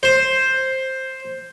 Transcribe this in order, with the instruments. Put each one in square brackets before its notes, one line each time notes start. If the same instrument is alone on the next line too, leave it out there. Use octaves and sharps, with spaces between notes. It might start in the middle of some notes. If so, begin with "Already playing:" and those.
[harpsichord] C5